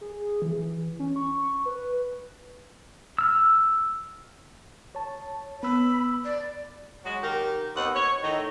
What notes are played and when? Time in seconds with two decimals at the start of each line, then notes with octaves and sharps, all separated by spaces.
0.01 G#4
0.42 E3
0.99 C#4
1.16 C#6
1.65 B4
3.18 E6 F6
4.95 C#5 A5
5.63 B3 B5 E6
6.25 D5
7.05 F#3 G#3 F#4
7.23 D#3 G4 A#4
7.76 D#2 B3 C4 D#4 F#5
7.95 C#5
8.23 A2 D#3 A3 D#4